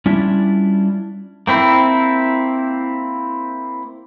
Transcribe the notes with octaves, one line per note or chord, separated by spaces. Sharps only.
G3 C#4 D4 E4 F4
A#3 C4 E4